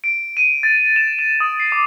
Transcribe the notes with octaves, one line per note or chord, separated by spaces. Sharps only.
D7
D#7
A6
E7
E7
D#6
C7
D6